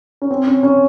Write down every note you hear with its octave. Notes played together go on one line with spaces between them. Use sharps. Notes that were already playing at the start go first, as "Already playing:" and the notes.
C#4
C4
C#4
C#4